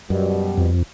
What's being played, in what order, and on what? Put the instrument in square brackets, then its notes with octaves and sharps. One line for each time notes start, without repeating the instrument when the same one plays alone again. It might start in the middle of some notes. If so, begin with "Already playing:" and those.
[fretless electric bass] F#2 [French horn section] B2 G3
[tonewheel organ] F2